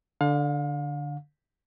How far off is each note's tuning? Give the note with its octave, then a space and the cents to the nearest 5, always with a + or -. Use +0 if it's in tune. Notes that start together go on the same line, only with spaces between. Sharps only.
D3 +0 F5 +35